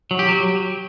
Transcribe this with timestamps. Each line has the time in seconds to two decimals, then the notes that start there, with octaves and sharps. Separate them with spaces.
0.11 F#3
0.19 G4
0.29 F#3